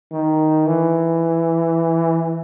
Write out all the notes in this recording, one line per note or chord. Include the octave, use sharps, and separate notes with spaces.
D#3
E3